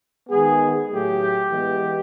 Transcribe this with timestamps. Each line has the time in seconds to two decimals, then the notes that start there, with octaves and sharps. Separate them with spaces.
0.30 D#3 G#3 B3 G#4
0.91 A2 F#3 A3 G4
1.51 E3 G#3 B3